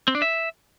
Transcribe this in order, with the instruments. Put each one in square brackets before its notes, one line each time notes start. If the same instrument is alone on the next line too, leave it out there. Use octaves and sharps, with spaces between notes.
[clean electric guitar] C4
D4
E5